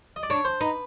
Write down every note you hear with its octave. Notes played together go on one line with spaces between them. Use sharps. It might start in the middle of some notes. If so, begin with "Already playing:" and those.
D#5
D5
D4 C#5
C5
D#4 B4